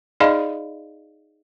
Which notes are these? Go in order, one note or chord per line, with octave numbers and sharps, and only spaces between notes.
D#4 G#4 D5 D#5 F5 B5